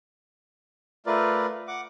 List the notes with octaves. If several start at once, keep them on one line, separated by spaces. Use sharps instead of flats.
A3 F4 A#4 B4 D5
F#5 D6